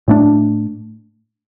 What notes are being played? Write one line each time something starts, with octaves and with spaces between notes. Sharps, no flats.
A2 A3 D4